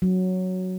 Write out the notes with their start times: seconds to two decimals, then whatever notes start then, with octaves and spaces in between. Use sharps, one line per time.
0.02 F#3